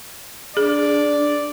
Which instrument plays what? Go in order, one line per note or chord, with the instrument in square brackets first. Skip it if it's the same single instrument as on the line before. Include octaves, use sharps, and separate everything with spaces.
[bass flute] D4 [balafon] G#4 [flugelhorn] D5